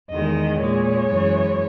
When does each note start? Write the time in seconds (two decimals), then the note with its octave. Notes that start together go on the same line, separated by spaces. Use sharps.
0.09 E2 D#3 G#3 D#5
0.58 A#2 G#3 C#5
1.08 F#2 E3 G#3